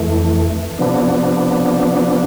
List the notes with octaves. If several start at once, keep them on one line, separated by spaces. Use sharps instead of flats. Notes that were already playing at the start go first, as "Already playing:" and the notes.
Already playing: F2 E3 A3
C3 F3 B3 D4